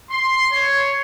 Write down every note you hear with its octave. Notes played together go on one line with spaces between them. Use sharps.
C6
C#5